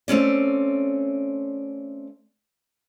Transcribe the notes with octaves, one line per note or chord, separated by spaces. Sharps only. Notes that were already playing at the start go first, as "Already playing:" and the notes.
A3 C4 C#4 D5